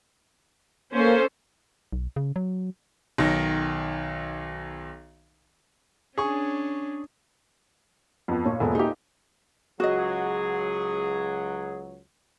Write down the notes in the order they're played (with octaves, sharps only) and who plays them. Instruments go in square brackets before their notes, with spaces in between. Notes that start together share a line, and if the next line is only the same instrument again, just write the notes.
[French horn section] A#3 [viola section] C#4 A4 C5
[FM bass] B1
C#3
F#3
[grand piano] B1 D#3
[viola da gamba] C#4 D4 [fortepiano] G#4 C#6
[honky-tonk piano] F2 B3
[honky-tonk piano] A#2 [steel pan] C#5
[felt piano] E1 B3 [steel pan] A4 B4 C5
[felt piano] D#4 G4 [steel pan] G#4 E5
[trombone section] C#2 F#3 [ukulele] F#4 D#5 [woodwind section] G#4